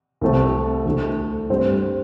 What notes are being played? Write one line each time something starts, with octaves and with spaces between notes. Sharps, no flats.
C2 C3 A3 C4
D2 D3 A3
G2 G3 C4